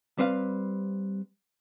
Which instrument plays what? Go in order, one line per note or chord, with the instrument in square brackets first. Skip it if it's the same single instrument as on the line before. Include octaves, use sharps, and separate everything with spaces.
[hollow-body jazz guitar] G3 C4 B4 F5